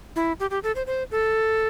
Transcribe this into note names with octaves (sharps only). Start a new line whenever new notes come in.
E4
G4
G4
A4
C5
C5
A4